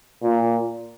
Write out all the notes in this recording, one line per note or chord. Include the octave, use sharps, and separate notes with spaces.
A#2